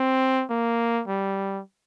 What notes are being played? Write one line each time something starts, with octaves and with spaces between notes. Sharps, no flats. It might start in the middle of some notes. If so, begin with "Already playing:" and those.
Already playing: C4
A#3
G3